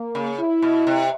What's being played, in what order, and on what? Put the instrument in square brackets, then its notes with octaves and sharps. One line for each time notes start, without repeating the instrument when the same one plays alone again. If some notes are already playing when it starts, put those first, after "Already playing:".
Already playing: [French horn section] A#3
[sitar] C#3
[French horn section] E4
[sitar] B2
C3